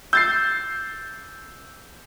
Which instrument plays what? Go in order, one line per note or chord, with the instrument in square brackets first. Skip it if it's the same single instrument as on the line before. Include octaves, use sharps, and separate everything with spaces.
[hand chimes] E6 [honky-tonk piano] G6 A6 C7